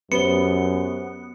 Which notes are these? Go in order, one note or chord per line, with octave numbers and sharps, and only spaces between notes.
F#2 B3 G4 C5 C#7 G7